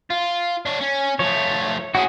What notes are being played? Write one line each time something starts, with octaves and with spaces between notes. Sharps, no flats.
F4
D4 C#5
C#4
F3 A3 C#5
C#4 E4 F#4 G#4